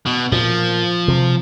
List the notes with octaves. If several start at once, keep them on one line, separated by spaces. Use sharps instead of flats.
B2
A#2 F3
C3